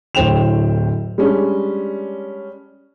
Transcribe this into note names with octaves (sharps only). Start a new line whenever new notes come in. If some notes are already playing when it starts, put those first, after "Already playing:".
D1 A2 C5 G5 E7 F7
G3 G#3 C#4 D4